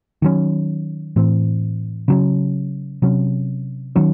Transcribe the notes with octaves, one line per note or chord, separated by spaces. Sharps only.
D#3 F#3 C#4
A2 E3 C4
C#3 F#3 C#4
C3 F#3 C#4
D#3 F#3 C#4